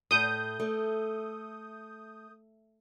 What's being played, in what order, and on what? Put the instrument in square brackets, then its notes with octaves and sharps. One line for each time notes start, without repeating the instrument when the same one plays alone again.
[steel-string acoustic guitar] A2 [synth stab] D#6 G6
[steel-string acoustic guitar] A3